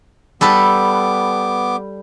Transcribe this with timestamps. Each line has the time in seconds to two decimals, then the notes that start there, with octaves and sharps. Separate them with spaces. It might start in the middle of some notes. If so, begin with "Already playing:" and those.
0.41 G3 B3 A4 B4 D6